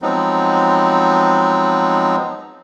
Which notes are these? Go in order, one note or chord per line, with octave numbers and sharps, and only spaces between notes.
F3 F#3 G#3 B3 C4 D#4